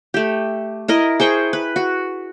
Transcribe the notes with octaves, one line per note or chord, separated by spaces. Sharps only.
A3 G4
E4 A#4 D#5
G#4 C5 G5 C#6
B4
F#4